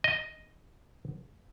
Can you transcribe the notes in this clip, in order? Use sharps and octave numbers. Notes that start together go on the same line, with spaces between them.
D#5